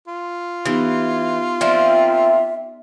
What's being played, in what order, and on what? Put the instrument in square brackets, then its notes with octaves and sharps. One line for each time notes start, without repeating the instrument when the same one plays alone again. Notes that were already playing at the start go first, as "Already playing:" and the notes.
[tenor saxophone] F4
[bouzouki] E3 [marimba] B3 D#4 G4
[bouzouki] F3 A#3 C4 [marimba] D5 [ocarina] E5